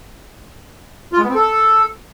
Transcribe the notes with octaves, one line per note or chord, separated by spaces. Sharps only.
F4
G#3
B3
C4
A4